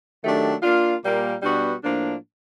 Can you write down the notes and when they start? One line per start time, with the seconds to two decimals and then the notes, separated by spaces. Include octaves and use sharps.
0.21 D#3 F#3 A3 D4 G4
0.62 A#3 D4 F4
1.02 A#2 G3 A#3
1.42 B2 G3 B3 D4 F#4
1.82 A2 F3 A#3 D4